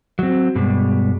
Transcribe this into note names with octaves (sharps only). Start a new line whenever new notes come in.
F#3 C4
G2 B2 G3 G#3